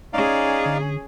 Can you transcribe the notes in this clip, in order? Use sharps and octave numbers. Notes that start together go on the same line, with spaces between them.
C#4 D#4 G#4 D5 F5
D3